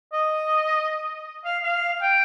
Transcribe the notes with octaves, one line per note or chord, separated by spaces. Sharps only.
D#5
F5
F5
G5